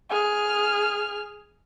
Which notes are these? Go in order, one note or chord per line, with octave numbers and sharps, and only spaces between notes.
G#4 F6